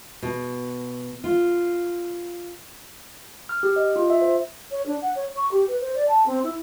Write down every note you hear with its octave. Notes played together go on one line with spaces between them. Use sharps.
B2
F4
F6
G4
D#5
F4
E5
C5
C#5
D4
F#5
C#5
C#6
G4
B4
C5
D5
A5
C4
E4